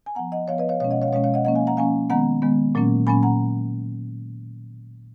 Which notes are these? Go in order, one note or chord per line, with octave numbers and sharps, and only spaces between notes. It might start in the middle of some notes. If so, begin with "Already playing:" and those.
G#5
F3 B3 F#5 A#5
D#5 F#5
F3 B3 C#5 F5
B4 D#5
C#5 F5
B2 G#3 C#4 C#5 F5
D#5 F#5
C#5 F5
F#5
B2 G#3 C#4 C#5 F5
C#5 F5
D#5 F#5
F3 A#3 C#4 D#5 F#5
F5 G#5
F#5 A#5
F3 A#3 C#4 F5 G#5
D#3 G#3 B3 F#5 A#5
D#3 G#3 B3
A#2 F#3 A#3 C#4
A#2 F#3 A#3 C#4 G#5 B5
F#5 A#5